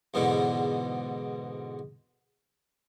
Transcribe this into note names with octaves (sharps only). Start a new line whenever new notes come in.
E2 G#2 B2 D3